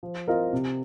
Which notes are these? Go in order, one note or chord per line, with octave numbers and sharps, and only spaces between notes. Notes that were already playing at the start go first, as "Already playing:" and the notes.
F3
C4 F4 A#4 D#5
C3